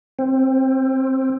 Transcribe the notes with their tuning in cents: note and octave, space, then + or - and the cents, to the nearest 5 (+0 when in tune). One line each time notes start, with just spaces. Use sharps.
C4 +15